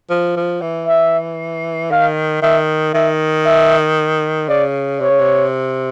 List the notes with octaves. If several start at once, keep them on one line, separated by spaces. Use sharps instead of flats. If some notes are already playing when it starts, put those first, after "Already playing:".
F3
F3
E3
E5
D#3 F5
D#3 E5
D#3 E5
E5
C#3 D5
C3 C#5
C#3
C3